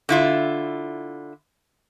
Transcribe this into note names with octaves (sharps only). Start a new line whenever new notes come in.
D3 E4 F4